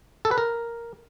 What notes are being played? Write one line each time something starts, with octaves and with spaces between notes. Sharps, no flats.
A4
B4
A#4